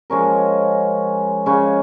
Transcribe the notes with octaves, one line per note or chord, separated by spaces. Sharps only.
F3 G#3 C#4 A#4
C#3 G#3 C#4